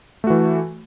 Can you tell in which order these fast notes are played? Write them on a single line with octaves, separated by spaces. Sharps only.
A3 F#4 E3